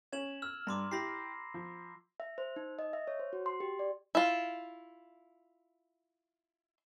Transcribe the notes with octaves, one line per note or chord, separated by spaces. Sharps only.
C#4 G#6 E7 F#7
E6 F6
G2 A#5 C6 D6
E4 G4 B5 A#6 C7
F3
E5
C5
D#4
D#5
E5
C#5
C5
F#4
C6
G4
D5
E4 F4